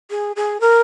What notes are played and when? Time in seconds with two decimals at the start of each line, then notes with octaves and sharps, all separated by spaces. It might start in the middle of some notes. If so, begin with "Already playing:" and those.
0.11 G#4
0.36 G#4
0.61 A#4